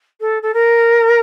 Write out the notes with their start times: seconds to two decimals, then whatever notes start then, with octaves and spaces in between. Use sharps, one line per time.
0.20 A4
0.42 A4
0.54 A#4